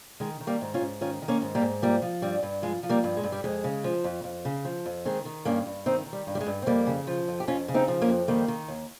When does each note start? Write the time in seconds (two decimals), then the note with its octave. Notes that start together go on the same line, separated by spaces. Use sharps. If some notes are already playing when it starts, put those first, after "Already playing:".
0.20 D#3 G#3
0.40 D#3
0.47 G3 A#3
0.61 G#2
0.74 C#4 F4
0.80 G#2
1.01 D#3 C#4 F4
1.22 D#3
1.28 A#3 C#4
1.42 G#2
1.55 G3 A#3
1.62 G#2
1.82 F3 G3 A#3
2.02 F3
2.22 G2 G3
2.43 G2
2.62 F3 G#3
2.83 F3
2.89 G3 A#3
3.04 G2
3.17 G#3
3.23 G2
3.32 G3
3.44 F2 G#3
3.64 C#3
3.84 F3
4.04 F2
4.24 F2
4.45 C#3
4.65 F3
4.86 F2
5.05 D#3 G#3 C4
5.25 D#3
5.45 G2 A#3 C#4
5.66 G2
5.86 D#3 C4 D#4
6.06 D#3
6.13 G3
6.27 G2
6.35 G3
6.40 G#3
6.47 G2
6.62 C4
6.66 F2 G3 A#3
6.86 C#3
7.07 F3
7.28 F2
7.40 G4
7.48 F2 C#4 F4
7.68 C#3
7.74 C4 D#4
7.88 F3
8.02 A#3 C#4
8.08 F2
8.28 D#3 G3 A#3
8.48 D#3
8.68 D#2